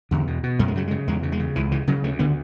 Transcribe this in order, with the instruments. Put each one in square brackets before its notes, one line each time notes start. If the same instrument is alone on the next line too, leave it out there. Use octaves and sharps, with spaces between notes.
[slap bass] E2 D3
B2
B2
F#2 A3
G#3
C#3 F#3
G#3
C#3
E2 G#3
C#3
G#3
C#3
C#2 E3
C#3 E3
C#3 F#3
D2 A3
D3 B3